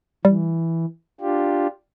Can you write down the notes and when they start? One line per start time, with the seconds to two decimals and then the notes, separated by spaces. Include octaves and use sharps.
0.25 E3 G3
1.21 D4 F4 G4